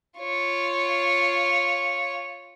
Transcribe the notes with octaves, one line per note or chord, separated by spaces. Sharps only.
F4 C#5